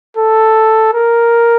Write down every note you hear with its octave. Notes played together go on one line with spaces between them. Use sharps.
A4
A#4